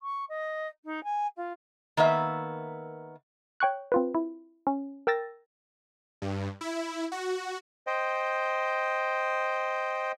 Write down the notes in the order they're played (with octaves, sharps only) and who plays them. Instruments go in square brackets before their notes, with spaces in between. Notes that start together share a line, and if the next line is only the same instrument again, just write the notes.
[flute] C#6
D#5
D#4
G#5
F4
[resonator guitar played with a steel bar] D#3 A#3 B3 E5
[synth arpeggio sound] C#5 G5 C#6 F#6
C4 F4 B4
E4
C#4
A#4 G5 E6 A6 A#6
[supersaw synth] G2
E4
F#4
[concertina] C5 D#5 G5